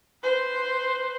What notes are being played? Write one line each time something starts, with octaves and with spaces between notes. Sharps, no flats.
B4 C5